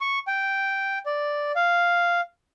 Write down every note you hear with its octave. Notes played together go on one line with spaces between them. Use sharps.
C#6
G5
D5
F5